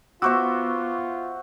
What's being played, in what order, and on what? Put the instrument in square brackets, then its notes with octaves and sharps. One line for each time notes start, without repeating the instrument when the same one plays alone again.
[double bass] B3 [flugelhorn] F4 [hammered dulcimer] F#4 C5 E5 [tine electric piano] C#6 D6 E6